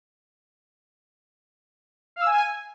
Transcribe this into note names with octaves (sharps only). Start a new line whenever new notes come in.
F5
E6
G#5